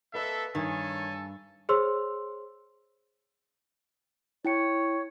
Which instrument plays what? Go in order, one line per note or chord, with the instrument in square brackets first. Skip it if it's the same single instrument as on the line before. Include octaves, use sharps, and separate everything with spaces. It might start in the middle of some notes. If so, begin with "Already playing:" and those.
[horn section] A#3 C4 A4 [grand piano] B4 D#5 [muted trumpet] E5
[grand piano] G2 [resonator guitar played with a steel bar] D#3 [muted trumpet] A4 [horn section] C#5 G#5
[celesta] G#4 C5 C#5 C6 E6
[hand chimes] E4 G5 C#7 [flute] C#5